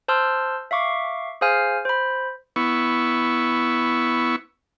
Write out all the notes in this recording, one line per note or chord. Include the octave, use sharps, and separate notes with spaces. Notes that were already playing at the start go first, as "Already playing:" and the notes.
C5 A5 C6 E6 F6
E5 F5 C#6 D6
G#4 C5 F5 G#5 F6
C5 B5
B3 E4 C#6